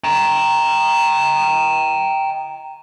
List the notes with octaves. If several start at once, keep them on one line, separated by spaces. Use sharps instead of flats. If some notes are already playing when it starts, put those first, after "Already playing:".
G5 A#5